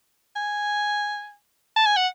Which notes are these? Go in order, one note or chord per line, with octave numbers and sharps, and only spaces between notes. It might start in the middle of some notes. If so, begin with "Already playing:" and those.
G#5
A5
G#5
F#5